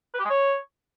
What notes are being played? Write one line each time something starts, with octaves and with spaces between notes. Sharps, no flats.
B4
G4
G#3
C#5